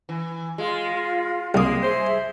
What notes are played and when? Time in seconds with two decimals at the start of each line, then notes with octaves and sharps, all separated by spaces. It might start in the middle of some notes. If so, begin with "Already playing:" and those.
0.09 E3
0.58 G#3 F4
1.54 C2 F#2 G#3 A#3 D#6
1.83 G#4 C5 E5